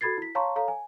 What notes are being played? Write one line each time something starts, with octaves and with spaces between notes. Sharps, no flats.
F#4 A4 B5 G#6 A6 C7
E4 B6
C#5 F5 A5 A#5 C6 C#6
A4 C#5 F5 A#5
G#5